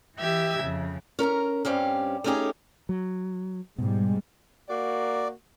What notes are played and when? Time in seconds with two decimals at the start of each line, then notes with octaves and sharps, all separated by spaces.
0.17 E3 G4 D#5 E5 E6 G#6
0.60 F2 C#3
1.19 C#4 A#4 A5 A#5
1.65 G2 G3 C4 C#4 F5
2.24 A3 B3 C#4 D#4 G4 G#4
2.89 F#3
3.78 G#2 B2 G3 G#3
4.68 A#3 F#4 D5